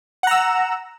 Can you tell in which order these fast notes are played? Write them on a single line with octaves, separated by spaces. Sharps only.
F#5 A#5 E6